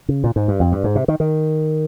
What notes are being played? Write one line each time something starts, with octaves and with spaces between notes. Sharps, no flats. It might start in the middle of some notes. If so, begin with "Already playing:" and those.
C#3
A#2
G#2
G2
F2
G2
G#2
C3
D#3
D#3